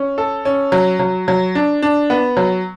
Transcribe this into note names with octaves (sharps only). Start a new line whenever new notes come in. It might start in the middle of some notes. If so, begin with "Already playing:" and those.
Already playing: C#4
A4
C#4
F#3
F#3
F#3
D4
D4
B3
F#3